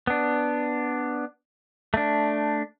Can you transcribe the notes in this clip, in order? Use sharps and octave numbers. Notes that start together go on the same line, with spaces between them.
B3 D4
A3 D4